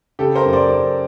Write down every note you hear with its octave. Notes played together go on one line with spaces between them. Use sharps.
C#3 G4 A4
A#4 C5
F#2
C5 D5
F#2